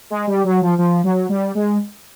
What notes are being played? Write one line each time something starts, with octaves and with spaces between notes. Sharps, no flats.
G#3
G3
F#3
F3
F3
F#3
G3
G#3